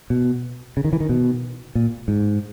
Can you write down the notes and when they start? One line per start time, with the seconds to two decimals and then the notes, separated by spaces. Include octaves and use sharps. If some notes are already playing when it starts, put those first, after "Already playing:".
0.10 B2
0.77 C#3
0.84 D#3
0.93 E3
1.00 D#3
1.09 B2
1.75 A#2
2.08 G#2